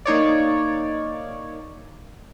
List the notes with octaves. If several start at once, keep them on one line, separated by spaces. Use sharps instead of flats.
A#3 D#4 C#5 D5